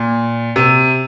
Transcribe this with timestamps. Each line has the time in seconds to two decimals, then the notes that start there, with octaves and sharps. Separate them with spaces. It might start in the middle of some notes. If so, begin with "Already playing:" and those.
Already playing: A#2
0.56 C3